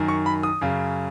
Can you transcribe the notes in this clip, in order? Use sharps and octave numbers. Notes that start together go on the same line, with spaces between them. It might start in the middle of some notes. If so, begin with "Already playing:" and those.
Already playing: F#2 D#3
C#6
B5
D#6
F#2 C#3